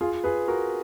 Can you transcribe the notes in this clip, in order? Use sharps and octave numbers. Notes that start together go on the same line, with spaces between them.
F4 G#4
G#4 B4
F#4 A#4